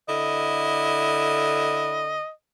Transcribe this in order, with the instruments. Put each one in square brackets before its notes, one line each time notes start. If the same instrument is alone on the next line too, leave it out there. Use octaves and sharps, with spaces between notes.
[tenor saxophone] D3 [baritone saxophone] E4 [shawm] D#5